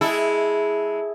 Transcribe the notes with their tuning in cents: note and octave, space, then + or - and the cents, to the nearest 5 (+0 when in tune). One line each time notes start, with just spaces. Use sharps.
G#3 +0 E4 -15 A4 +0